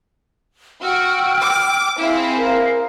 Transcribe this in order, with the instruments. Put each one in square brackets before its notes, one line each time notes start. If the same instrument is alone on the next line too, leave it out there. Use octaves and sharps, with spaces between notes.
[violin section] F#4 [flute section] G5 E6 F6
[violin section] D6
[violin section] C4 E4 G#4 [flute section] F5
[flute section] A#4 F5